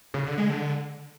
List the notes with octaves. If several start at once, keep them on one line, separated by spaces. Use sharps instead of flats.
C#3
D3
G#3
D3